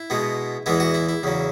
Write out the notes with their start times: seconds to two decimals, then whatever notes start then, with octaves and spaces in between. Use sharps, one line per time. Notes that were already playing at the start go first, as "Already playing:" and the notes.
Already playing: E4
0.10 B2 G#3 B3
0.66 E2 E3 G#3 B3 E4
0.80 F#4
0.94 E4
1.09 E4
1.23 E2 C#3 F#3